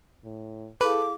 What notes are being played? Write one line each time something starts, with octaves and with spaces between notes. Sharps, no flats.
A2
E4 G#4 A4 B4 F5 D6